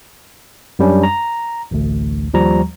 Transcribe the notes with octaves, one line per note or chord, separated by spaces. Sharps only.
F#2 G3 C#4 D4
A#5
A1 D2
D#2 F3 G3 A#5